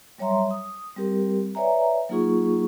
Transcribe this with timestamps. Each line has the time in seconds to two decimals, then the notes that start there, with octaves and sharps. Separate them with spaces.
0.18 F#3 G3 C#5 E5 A#5 C6
0.51 D#6
0.97 G3 C4 G4 A#4
1.55 B4 C#5 D5 E5 G#5 A#5
2.09 F#3 A#3 D#4 F4 G#4 C#6